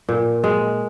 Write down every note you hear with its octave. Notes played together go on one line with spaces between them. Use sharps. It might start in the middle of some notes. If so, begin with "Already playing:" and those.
A#2
G#3